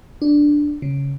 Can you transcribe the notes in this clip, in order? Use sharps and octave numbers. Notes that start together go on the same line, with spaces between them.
D4
C#3